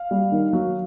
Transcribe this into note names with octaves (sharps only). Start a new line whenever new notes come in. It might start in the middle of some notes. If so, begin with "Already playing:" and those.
Already playing: F5
G3
D#3
F#3